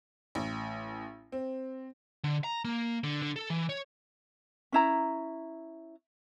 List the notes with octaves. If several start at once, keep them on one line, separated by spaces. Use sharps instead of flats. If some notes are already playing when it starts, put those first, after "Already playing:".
A1
C4
D3
A#5
A#3
D3
D3
A4
E3
C#5
C#4 E4 A#5